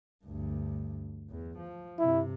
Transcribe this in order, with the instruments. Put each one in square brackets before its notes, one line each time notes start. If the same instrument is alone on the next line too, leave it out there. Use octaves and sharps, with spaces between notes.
[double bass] D2 G2
E2
F3
[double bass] G2 C3 [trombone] E4